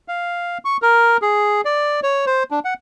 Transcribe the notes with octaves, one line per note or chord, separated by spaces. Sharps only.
F5
C#6
A#4
G#4
D5
C#5
C5
D4
F#5